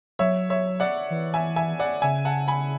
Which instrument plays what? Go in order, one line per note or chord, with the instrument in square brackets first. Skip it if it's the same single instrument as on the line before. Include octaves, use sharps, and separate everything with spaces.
[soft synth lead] F#3 [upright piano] C#5 E5
[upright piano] C#5 E5
D5 F#5
[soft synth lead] E3
[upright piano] E5 G#5
E5 G#5
D5 F#5
[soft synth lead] C#3 [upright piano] E5 G#5
[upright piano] F#5 A5
G#5 B5